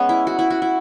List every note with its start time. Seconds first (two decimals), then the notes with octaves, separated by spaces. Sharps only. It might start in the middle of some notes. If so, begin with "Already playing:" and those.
Already playing: G#3 B3 C#4
0.09 E4
0.27 F#4
0.39 E4
0.50 F#4
0.62 E4